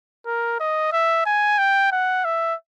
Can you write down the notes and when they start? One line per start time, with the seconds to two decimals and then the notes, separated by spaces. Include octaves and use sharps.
0.26 A#4
0.60 D#5
0.92 E5
1.26 G#5
1.58 G5
1.92 F#5
2.25 E5